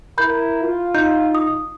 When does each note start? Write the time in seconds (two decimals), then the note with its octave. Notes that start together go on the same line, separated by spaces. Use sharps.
0.18 E4 A#4 B5 G6
0.61 F4
0.95 D#4 G6
1.35 D#6